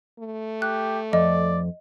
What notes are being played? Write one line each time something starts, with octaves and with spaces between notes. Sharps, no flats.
A3
G4 F#6
F2 D5 D#5